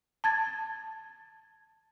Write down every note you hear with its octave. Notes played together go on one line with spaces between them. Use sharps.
A5 G#6 A6